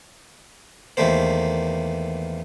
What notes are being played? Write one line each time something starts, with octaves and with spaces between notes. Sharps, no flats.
E2 D#3 A3 A#3 C5